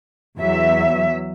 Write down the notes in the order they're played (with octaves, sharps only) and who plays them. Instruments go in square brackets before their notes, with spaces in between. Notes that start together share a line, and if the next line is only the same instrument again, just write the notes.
[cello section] E2 F#3 E5